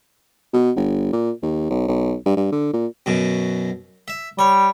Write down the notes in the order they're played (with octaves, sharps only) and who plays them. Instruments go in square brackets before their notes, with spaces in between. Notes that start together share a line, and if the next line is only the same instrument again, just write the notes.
[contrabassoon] B2
G1
A#2
D#2
B1
B1
G2
G2
D3
A#2
[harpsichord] F#2 B2
E5
[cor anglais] G3 [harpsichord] C#5